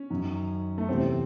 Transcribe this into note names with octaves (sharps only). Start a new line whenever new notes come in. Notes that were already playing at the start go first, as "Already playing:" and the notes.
Already playing: C#4
F#2 D#3
A3
E2 C3 E3 C4